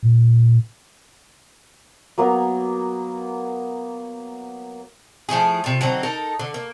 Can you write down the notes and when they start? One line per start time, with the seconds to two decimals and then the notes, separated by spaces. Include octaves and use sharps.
0.03 A#2
2.18 F#3 A#3 B3
5.29 F3 A3 E4 G#4
5.64 C3 F4
5.81 D3 F#3 C4 D#4
6.03 D#4 A4 A#4
6.39 D3
6.54 A#3